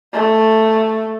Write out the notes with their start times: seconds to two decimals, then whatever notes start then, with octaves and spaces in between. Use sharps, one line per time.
0.14 A3